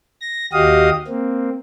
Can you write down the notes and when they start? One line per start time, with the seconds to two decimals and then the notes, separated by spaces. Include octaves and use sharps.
0.21 A#6
0.53 D#2 F#4 G4 D#5 F5 D#6
1.08 A#3 C4